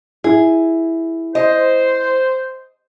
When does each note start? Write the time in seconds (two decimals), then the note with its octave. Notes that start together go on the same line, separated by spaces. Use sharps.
0.24 E4 G#4
1.35 C5 D#5